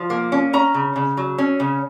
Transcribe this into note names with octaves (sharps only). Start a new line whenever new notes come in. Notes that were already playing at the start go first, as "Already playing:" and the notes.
Already playing: F3
A#3
C#4
C#4 A#5
C#3
C#3
F#3
C#4
C#3